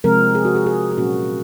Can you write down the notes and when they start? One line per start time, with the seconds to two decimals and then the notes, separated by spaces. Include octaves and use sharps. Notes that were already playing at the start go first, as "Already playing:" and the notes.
0.04 C3 F3 G#3 C4 A#4
0.35 G#4
0.45 F#4
0.56 G#4
0.66 G#4
0.92 G#4
0.97 A#2 F#3 A#3 C#4 F#4